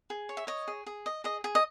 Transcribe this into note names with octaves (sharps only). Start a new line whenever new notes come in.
G#4
C#5
E5
C#5 D#5
G#4
G#4
D#5
G#4 D#5
G#4
D#5